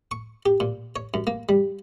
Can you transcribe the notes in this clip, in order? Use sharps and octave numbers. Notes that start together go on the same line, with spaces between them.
C#6
G4
A#2
C#5
F#2
A#3
G3